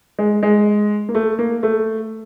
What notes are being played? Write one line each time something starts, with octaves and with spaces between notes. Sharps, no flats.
G#3
G#3
A#3
A3
A#3
A3